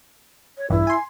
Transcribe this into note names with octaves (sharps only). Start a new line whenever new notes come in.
C#5
A#1 E2 G2 E4
G#5 C6